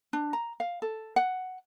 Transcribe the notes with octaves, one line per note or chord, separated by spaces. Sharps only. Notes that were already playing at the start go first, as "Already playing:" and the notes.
D4
A#5
F5
A4
F#5